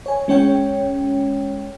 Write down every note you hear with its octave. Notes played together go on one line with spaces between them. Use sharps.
C#5 G#5
G#3 C#4 C#5 G5